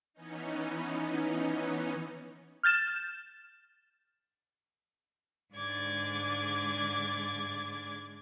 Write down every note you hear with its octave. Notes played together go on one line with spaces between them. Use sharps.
E3 B3 C#4 D#4
F6 G6 A6 E7
G#2 D3 G#3 D5 D6 G#6